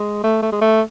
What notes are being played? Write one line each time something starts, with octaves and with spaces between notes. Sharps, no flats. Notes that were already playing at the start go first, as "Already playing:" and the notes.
Already playing: G#3
A3
A3
G#3
A3